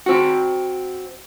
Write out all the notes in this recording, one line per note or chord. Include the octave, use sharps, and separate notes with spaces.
C4 F#4